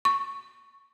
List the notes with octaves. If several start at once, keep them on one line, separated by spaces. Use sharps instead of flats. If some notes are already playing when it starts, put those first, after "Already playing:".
C#6